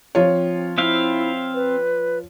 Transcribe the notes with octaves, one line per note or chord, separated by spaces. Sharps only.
F3 C4 F4 C#5
C4 E4 E5 F5
B4